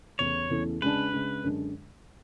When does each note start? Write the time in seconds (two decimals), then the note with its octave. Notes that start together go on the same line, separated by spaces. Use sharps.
0.19 E2 C#3 E3 A3 C#5
0.50 E2 C#3 E3 A3
0.81 C#3 G#3 D4 B4
1.12 C#3 G#3 D4
1.43 F#2 D3 G#3 D4